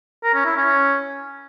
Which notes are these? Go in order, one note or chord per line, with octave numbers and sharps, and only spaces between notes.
A#4
C#4
E4
C#4